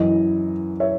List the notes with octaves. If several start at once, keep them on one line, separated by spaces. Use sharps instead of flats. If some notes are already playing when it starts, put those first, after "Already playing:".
Already playing: F#2 E3 D#5
C#5 E5